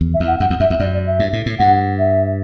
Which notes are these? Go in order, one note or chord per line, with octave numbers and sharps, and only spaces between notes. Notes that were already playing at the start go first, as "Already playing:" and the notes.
E2
E5
E2
F#5
F#2 F#5
E2
F#2 E5
E2
F#2 D5
D5
E5
G2
A2
A2
G2 F#5
E5